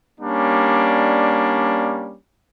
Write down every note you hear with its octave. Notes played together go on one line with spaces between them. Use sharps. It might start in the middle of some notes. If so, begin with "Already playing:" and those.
G3 A#3 C#4 D4